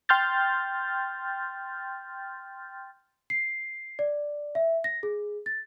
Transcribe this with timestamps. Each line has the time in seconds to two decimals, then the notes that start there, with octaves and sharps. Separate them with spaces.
0.09 G5 C6 F6 G6 A6
3.30 C7
3.99 D5
4.55 E5
4.84 A#6
5.03 G#4
5.46 A6